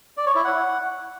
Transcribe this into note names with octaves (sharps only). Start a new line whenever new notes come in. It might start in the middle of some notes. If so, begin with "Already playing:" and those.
D5
C#5
E4
F#5